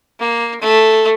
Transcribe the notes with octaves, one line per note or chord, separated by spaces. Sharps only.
A#3
A3